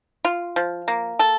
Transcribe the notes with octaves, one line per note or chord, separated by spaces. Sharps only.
F4
F3
A#3
A4